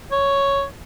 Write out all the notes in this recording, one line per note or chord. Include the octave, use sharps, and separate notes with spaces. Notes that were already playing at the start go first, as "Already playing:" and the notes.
C#5